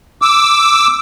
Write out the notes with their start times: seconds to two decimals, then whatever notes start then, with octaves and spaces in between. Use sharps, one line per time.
0.22 D6 E6